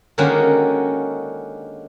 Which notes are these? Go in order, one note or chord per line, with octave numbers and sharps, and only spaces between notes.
D3 D#3 G#3 A#3 C#4 F#4